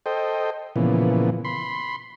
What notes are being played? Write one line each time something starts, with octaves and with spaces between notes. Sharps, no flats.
A4 C5 D#5 G5
A#2 C#3 E3 F3 B3
B5 C6